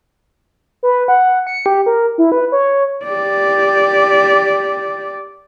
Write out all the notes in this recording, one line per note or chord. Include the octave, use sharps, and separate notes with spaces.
B4
F#5
C#7
G4
A#4
E4
B4
C#5
G4 D5